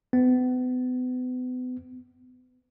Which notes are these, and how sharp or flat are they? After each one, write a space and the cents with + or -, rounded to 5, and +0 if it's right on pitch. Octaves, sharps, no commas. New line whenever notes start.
B3 +35